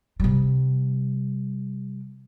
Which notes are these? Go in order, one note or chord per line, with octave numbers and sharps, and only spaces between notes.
C3 G3